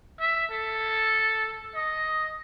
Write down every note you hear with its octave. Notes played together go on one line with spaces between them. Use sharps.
E5
A4
D#5